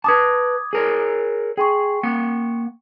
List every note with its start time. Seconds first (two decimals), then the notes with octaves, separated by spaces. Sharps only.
0.04 B4 A5 D6 D#6 G#6
0.73 G#4 A#4 C#5
1.57 G#4 G5 C6 C#6
2.03 A#3 F#5